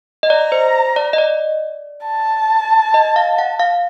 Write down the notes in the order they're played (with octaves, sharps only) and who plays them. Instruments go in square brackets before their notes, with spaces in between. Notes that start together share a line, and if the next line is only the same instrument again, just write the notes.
[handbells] D#5
[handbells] D5 [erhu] A#5
[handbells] C5
D5
D#5
D5
[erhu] A5
[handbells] D#5
F5
F#5
F5